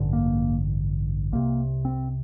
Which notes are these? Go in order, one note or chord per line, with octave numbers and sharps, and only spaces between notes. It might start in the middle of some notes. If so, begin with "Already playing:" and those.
Already playing: A1 G2 D3
A#3
C2 C3 A#3
C4